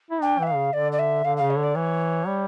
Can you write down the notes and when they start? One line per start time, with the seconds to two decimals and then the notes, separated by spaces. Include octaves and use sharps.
0.11 E4
0.22 D4 G5
0.39 E3 E5
0.47 F5
0.55 C#3
0.73 D3 D5
0.92 D5
0.98 E5
1.24 D3 F5
1.37 C#3 F5
1.50 C#5
1.58 D3 D5
1.75 E3 C#5
2.27 G3